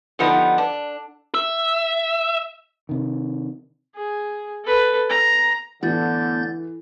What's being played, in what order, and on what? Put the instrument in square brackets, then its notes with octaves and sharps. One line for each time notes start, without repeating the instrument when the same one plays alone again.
[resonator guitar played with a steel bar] D3 F3 G3 B3 D#4
D4
[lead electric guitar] E5
[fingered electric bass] C3 D#3
[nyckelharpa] G#4
A4 B4
A#5
[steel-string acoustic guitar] A2 [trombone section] D3 [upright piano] E3 [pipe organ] B3 G6 A6